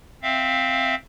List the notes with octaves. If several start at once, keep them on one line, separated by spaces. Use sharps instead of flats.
C4 E5 F5